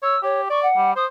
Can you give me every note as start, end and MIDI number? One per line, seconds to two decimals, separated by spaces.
0.02 0.16 73
0.02 0.20 88
0.23 0.49 67
0.23 0.41 73
0.50 0.67 74
0.50 0.61 85
0.62 0.91 78
0.77 0.96 55
0.96 1.07 72
0.96 1.04 87